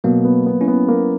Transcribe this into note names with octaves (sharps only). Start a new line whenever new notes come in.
B2 F#3 A#3
B3
B3
C#4 E4
B3
A#3